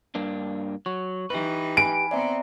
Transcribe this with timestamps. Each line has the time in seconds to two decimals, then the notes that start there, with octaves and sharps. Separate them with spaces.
0.15 G2 A#3 D4
0.86 F#3 C#6
1.30 E3 D#4 G4 B4
1.77 G#5 B5 D7
2.11 B3 C4 D5 E5 A#5